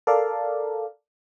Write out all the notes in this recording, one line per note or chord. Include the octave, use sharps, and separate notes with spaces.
A4 A#4 D5 F5